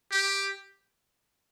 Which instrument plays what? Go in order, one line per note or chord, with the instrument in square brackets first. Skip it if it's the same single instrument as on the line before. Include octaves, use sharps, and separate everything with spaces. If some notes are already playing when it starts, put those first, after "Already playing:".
[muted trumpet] G4